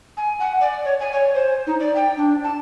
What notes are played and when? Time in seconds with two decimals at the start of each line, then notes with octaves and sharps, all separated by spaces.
0.17 G#5
0.40 F#5
0.61 D5
0.85 C#5
1.00 G#5
1.12 C#5
1.34 C5
1.67 D#4
1.80 D5
1.96 G5
2.17 D4
2.44 A5